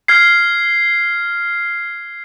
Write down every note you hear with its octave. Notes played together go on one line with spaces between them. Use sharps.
F6 G#6 C7